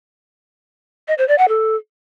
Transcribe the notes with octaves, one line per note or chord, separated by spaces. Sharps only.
D#5
C5
D5
F#5
A4